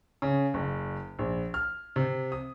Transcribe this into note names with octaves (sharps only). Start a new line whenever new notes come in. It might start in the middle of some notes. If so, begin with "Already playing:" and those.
C#3
F#1
A#1
F6
C3
D#6